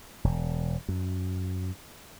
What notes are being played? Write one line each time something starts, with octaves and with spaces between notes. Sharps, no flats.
E1
F#2